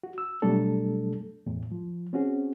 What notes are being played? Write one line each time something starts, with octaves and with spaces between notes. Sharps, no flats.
F#4
E6
B2 F#3 G3 A3 D4 A4
E2 A2
F3
C4 C#4 F#4 G#4